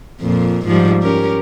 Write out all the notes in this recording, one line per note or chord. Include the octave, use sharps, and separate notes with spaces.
F2 A#2
G#2 F3 G3
C#4 G4 A#4